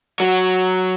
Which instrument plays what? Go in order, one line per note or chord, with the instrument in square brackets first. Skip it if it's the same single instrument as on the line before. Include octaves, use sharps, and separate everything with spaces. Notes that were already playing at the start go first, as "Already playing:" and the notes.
[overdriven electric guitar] F#3